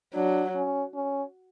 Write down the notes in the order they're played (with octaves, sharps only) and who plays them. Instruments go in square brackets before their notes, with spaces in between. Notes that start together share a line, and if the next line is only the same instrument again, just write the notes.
[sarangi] F#3 [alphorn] D4
[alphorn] C#4
C#4